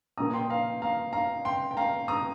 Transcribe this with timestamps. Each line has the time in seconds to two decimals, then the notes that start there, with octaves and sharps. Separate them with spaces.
0.18 A#1 A#2 A#3 A#5 D#6
0.34 G5 C6
0.50 F5 A#5
0.82 F5 A#5
1.13 F5 A#5
1.45 G5 C6
1.71 G5
1.77 F5 A#5
2.08 A#5 D#6